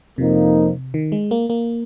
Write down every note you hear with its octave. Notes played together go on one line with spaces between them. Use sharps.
F2 C3 F3 A#3 D#4
D#3
G#3
A#3
A#3